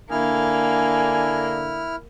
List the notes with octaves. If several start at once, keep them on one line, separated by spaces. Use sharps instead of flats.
D3 A#3 D4 E4 G#5 F6